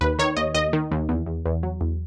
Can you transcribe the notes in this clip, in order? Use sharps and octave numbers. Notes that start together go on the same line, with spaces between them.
D#2 B4
D#3 C#5
D#2 D#5
D#2 D#5
D#3
D#2
E2
E2
E2
F#3
E2